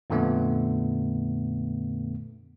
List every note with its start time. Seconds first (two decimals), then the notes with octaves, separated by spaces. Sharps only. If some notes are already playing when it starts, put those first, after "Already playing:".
0.10 F2 A#2 D3 A3 B3